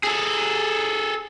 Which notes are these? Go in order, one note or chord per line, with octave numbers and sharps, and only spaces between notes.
G#4 A4